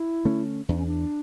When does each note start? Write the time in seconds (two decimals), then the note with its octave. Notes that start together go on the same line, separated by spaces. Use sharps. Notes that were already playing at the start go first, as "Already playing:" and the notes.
Already playing: E4
0.25 D3 A3 C#4
0.68 E2 D4
0.77 C#4
0.86 D4